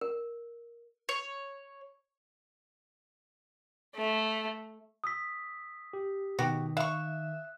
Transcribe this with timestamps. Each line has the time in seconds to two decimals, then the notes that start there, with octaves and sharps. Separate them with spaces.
0.01 A#4
1.09 C#5
3.95 A3
5.04 D#6 E6 B6
5.93 G4
6.39 B2 D#3 F#4 G4
6.77 E5 F5 C#6 F#6